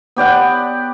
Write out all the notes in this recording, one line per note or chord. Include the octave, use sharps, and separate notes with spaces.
B3 G4 D5 F#5